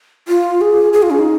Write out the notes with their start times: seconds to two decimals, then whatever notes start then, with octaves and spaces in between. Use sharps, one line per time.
0.28 F4
0.61 G#4
0.93 G#4
1.02 F4
1.11 C#4
1.19 D#4